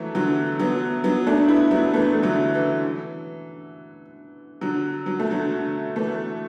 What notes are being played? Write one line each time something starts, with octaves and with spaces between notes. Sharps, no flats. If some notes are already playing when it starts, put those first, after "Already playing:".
Already playing: E3 F#3 A3 B3
D3 F#3
F#3 B3
F#3 B3
A3 D4
B3 E4
F#3 B3
E3 A3
A3
D3 F#3
E3
D3 F#3
F#3
A3
D3 F#3
D3
E3 A3